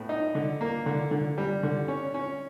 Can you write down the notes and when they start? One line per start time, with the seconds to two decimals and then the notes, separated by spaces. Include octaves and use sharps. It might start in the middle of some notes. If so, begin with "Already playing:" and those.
Already playing: A2 B3
0.09 D#4
0.35 D3
0.61 A#3
0.86 D3
1.11 D3
1.38 G3
1.63 D3
1.88 C#4
2.14 C#4